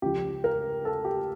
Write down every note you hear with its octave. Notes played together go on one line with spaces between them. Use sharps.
C#2 C#3 F3 G4
A#4
A4
G4